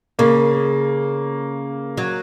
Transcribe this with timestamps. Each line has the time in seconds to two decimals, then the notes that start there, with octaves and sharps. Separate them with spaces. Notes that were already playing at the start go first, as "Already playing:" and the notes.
0.19 C#3 A#3
1.97 F#3